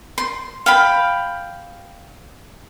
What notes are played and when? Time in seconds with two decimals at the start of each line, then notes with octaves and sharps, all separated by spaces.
0.18 C6
0.66 F5 G5 B5